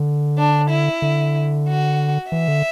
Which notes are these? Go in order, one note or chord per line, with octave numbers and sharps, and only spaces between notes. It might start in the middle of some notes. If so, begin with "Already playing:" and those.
Already playing: D3
D4
E4
D3
F#4
E3 E5
D3